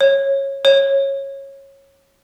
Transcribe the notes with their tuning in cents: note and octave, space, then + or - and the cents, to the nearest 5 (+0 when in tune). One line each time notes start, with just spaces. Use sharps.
C#5 -15
C#5 -15